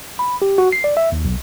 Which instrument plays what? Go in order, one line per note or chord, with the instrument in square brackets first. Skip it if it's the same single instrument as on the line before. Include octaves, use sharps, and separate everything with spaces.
[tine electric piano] B5
G4
F#4
C7
D5
E5
D#2
B1